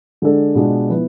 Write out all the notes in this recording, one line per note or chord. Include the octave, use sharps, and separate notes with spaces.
D3 G#3 D4 A4
B2 G#3 D4 F4
F3 B3 E4 B4